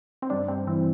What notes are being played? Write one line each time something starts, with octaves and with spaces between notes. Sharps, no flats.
C4
G2 D4
G2 C4
E3 C4